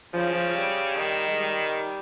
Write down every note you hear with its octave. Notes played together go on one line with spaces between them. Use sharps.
C#3 F3
F3
G3
D#3
G#3
G3